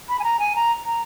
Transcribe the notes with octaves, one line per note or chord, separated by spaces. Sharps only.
B5
G#5
A#5
G#5
A#5
A#5